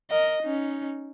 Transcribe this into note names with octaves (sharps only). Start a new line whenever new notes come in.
A#4 D#5
C#4 D#4